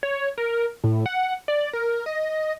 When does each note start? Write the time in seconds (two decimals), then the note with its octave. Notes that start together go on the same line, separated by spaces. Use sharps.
0.03 C#5
0.38 A#4
0.84 A2
1.06 F#5
1.48 D5
1.73 A#4
2.06 D#5